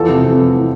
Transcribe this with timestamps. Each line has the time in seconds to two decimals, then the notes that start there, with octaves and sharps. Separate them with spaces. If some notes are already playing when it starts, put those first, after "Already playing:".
Already playing: E2 F3 A4
0.09 C3
0.24 C3
0.39 E2
0.54 E3